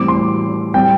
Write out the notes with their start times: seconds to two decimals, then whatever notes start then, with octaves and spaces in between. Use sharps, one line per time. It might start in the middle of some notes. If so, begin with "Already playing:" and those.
Already playing: A2 E3 G3 C4 D6
0.08 C6
0.74 A2 G3 C4 G5